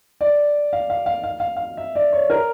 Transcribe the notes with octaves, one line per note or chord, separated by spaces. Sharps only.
D5
F5
F5
F5
F5
F5
F5
E5
D5
C#5
A#4